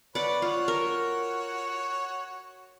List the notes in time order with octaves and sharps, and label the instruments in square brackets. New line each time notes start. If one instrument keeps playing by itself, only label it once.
[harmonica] B4 C#5 [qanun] D5 F#5
[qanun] F4 [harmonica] F#4 C#5 F#5
[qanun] A#4